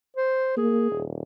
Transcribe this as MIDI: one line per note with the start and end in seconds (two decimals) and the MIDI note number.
0.17 0.57 72
0.57 0.91 58
0.57 1.03 68
0.92 1.23 27